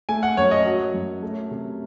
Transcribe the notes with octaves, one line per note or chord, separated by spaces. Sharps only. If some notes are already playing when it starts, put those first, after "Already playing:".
A3 G#5
F#5
F#2 C#5
D#5
F#3
F#2
A3
C3